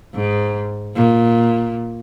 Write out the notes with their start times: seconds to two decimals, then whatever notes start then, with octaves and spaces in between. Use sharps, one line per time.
0.14 G#2
0.96 A#2